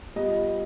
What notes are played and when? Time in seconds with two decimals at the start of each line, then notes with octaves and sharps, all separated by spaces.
0.16 G3 B3 F4 D#5